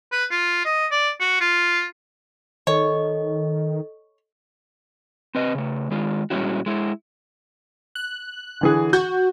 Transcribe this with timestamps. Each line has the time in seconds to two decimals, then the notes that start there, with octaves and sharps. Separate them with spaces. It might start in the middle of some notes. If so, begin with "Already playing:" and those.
0.12 B4
0.31 F4
0.65 D#5
0.91 D5
1.20 F#4
1.41 F4
2.67 D#3 A4 C#5 D#5
5.35 C4 B4 D#5
5.55 C#3 A3
5.91 D#3 G#3 F4
6.30 A#2 G3 G#3 C#4 E4 F#4
6.66 G#3 E4
7.95 F#6
8.61 D3 E3 G#4
8.93 F#4 G6